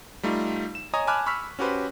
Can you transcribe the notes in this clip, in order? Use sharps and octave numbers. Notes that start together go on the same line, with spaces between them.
G3 A3 D#4 F4
E7
C#5 D#5 G#5 A#5 D#6
G#5 A5 B5 D6 F6 F#6
B5 C#6 E6 F6 B6
C#4 F#4 G4 B4 C5